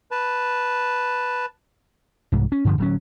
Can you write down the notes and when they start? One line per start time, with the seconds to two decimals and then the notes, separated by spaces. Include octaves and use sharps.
0.11 B4 A5
2.32 C2 G#2
2.52 C#4
2.65 G2 D3 F3
2.78 D1 F#3 C#4